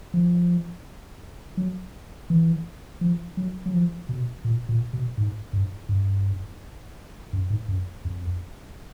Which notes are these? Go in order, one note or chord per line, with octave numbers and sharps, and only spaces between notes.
F3
F#3
E3
F3
F#3
F#3
F3
B2
A#2
A#2
B2
G#2
G2
G2
F#2
G#2
F#2
F2